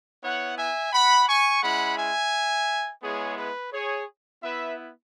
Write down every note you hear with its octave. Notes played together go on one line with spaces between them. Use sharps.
B3 E4 C#5 F#5
E5 G#5
F#5 B5
G#5 C#6
G#3 C#4 E4 F#5 B5
E5 G#5
G#3 B3 E4 G#4 C#5
B4
G#4 C#5
B3 E4 B4 E5